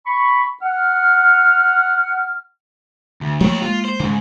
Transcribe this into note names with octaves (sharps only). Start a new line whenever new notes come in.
B5 C#6
F#5 F6
D2
F3 A3 A#3 G4 C#5
G#3 A#3 F4
C5
D2 G#2 C#3